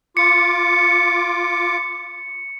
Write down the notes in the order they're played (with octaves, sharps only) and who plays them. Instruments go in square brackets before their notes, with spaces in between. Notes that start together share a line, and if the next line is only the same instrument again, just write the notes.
[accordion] F4 D6 [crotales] C#7